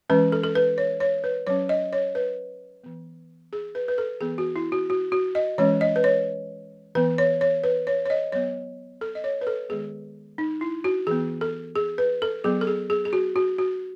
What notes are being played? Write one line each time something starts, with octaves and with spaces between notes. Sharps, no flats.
E3 G#3 C#4 B4
A4
A4
B4
C#5
C#5
B4
F#3 C#4 C#5
D#5
C#5
B4
E3 B3
G#4
B4
B4
A4
E3 B3 G#4
F#4
E4
F#4
F#4
F#4
D#5
E3 G#3 C#4 C#5
D#5
B4
C#5
E3 B3 B4
C#5
C#5
B4
C#5
C#5
D#5
F#3 B3 C#5
A4
D#5
C#5
B4
A4
D#3 G#3 B3 G#4
D#4
E4
F#4
E3 B3 G#4
A4
G#4
B4
A4
F#3 B3 G#4
A4
G#4
G#4
G#4
F#4
F#4
F#4